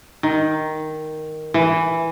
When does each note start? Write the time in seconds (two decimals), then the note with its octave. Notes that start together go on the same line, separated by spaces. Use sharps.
0.23 D#3
1.54 E3